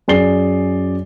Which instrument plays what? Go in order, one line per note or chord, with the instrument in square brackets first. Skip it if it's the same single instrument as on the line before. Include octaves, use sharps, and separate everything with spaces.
[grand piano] F#2 G#4 D5 C7 G7